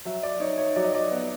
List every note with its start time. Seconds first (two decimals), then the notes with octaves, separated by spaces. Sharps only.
0.05 F#3 E5
0.23 D5
0.40 D#4 C#5
0.58 C#5
0.76 F#3 D5
0.84 D#5
0.94 D5
1.11 B3